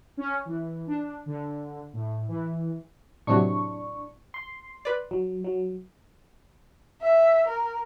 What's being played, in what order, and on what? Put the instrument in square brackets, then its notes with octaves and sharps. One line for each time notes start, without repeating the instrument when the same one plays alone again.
[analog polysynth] C#4
E3
D4
D3
A2
E3
[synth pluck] A2 C3 F#3 [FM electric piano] D4 C#6
[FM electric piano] C6
[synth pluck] B4 D5
[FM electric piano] F#3
F#3
[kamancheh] E5
A#4